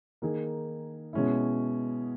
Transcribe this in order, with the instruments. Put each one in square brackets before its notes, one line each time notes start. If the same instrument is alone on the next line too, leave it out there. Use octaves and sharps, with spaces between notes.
[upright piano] D#3 A#3 D#4 G#4
B2 G#3 C#4 E4